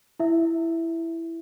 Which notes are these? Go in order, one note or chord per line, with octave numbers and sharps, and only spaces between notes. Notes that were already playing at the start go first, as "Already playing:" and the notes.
E4 E5